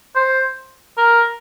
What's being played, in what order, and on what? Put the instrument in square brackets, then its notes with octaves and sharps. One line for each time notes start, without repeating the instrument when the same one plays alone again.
[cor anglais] C5
A#4